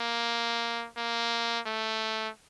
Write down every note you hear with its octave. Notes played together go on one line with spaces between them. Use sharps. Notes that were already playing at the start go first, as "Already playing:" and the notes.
Already playing: A#3
A#3
A3